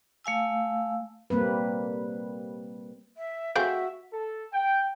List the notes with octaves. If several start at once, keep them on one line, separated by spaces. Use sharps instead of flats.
A3 F5 G#5 E6
G3 A#3 C4 B4
E5
A3 C4 F#4 G#4 E5 F5 G6 D7
A4
G5